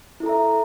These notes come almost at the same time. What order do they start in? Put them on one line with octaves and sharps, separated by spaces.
E4 A4 A#5 E5